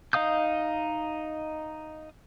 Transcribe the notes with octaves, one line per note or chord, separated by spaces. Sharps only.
D#4 D#5 F5 D#6 G6